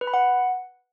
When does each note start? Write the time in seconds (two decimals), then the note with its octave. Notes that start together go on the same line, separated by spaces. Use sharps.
0.01 B4
0.07 B5
0.14 F#5